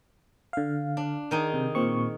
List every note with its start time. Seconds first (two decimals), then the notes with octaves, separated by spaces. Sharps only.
0.53 D3 F5
0.97 D4
1.31 D#3 D#4 G#4
1.54 C3
1.75 A#2 C4 C#6